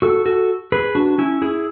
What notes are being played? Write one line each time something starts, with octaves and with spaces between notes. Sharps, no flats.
F#4 A4
F#4 A4
G#4 B4
D4 F#4
C#4 E4
E4 G#4